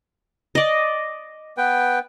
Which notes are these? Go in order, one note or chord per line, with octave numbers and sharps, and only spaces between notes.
D5 D#5
B3 B4 G5